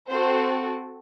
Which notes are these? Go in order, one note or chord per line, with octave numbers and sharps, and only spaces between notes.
C4 F#4 A4 C5